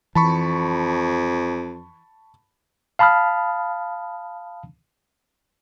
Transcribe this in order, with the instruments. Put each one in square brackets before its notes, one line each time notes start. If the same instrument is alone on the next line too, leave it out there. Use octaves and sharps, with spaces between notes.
[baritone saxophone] F2 [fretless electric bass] E3 [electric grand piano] A5 B5 C#6
[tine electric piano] F5 A5 B5 D#6 F6